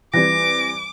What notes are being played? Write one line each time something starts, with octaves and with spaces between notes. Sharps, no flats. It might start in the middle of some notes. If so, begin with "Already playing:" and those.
E3 G3 C4 D6 A#6